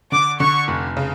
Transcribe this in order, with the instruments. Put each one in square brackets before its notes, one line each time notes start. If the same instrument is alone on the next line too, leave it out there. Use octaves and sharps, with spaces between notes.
[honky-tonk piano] D3 [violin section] D6
[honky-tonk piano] D3 [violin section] C#6
[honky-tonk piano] F1
C#3